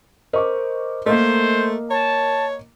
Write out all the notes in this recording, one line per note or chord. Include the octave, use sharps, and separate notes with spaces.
A#4 C5 D#5 C#6 D6
A3 A#3 A#4 C5 D#5
C#5 A5